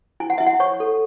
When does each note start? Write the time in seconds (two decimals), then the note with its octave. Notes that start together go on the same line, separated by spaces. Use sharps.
0.20 E4 G#5
0.30 F#5
0.38 E4 E5
0.46 F#5
0.60 C#5 C#6
0.80 A4